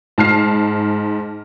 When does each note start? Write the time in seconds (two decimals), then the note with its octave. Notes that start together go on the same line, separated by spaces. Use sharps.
0.18 G#2 A5 F6 C7